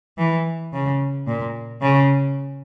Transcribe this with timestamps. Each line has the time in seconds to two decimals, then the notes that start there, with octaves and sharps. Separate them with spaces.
0.18 E3
0.73 C#3
1.27 A#2
1.82 C#3